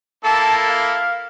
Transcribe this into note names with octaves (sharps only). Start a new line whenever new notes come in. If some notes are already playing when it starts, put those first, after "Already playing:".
A#3 E4 A4 A5
F5